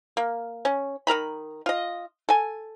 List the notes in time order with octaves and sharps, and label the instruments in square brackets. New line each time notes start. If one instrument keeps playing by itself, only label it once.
[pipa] A#3
C#4
D#3 A#4 A#5 B5
F4 D#5
A4 G#5